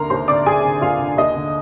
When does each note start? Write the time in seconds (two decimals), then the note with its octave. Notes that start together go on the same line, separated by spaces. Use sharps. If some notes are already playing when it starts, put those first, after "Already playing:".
Already playing: D#2 D3 A#4 A#5 C6
0.10 D#2 C5 C6
0.28 D3 D5 D6
0.46 D#2 G#4 G#5
0.64 D3
0.82 D#2 F4 F5
0.99 D3
1.17 D#2 D#5
1.35 D3